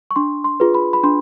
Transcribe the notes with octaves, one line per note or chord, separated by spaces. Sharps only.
C#6
D4 C6
C6
F4 G#4 B4
B5
B5
D4 C6